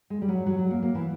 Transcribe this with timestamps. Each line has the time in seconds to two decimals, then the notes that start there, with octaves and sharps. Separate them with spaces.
0.10 G#3
0.22 G3
0.29 F#3
0.46 F#3
0.59 F#3
0.71 A#3
0.83 A#3
0.95 E3